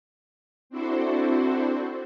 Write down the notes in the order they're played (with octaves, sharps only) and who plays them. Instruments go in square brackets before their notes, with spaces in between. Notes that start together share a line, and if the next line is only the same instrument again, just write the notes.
[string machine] C4 D4 E4 F#4 A4 C5